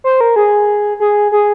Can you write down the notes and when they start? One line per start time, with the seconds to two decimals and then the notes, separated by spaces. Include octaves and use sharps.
0.04 C5
0.21 A#4
0.36 G#4
1.00 G#4
1.32 G#4